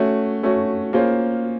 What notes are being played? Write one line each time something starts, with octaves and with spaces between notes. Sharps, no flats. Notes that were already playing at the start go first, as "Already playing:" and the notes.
Already playing: A3 C#4 F#4
A3 C#4 F#4
A#3 C#4 F4 G#4 C5